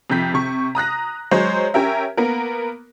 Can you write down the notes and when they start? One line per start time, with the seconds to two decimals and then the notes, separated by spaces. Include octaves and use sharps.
0.10 F2 C3 G6 B6
0.34 C3 C#6
0.75 A#5 D#6 F#6 A#6
1.31 F#3 G#3 C5 C#5
1.74 C#4 G4 A#4 E5
2.17 A#3 B3 A#4